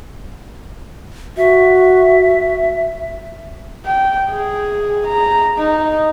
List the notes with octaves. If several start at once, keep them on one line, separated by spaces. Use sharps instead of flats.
F#4 E5
G5
G#4
A#5
D#4